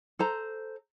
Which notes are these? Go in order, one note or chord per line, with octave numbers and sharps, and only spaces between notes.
A4 C5 A#5